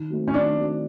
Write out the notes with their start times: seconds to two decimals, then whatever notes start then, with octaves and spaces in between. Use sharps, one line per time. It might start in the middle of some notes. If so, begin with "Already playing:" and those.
Already playing: D#3
0.10 F#3 A3 C4
0.28 C#4
0.34 D#3 D4
0.58 F#3 A3 C4